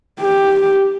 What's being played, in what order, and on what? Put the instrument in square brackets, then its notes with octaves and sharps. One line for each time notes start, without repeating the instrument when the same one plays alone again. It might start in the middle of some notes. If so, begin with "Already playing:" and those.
[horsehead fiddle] G4